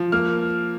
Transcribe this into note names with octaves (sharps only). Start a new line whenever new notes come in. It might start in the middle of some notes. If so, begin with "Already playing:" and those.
Already playing: F3
A#3 F6